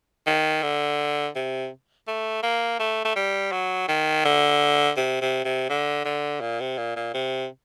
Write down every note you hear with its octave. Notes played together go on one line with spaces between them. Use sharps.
D#3
D3
C3
A3
A#3
A3
A3
G3
F#3
D#3
D3
C3
C3
C3
D3
D3
A#2
C3
A#2
A#2
C3